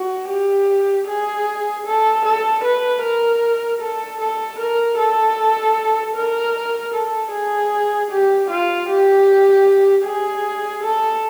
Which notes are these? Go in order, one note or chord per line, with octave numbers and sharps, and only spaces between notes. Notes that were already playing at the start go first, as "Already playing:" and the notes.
Already playing: F#4
G4
G#4
A4
A4
B4
A#4
A4
A4
A#4
A4
A#4
A4
G#4
G4
F4
G4
G#4
A4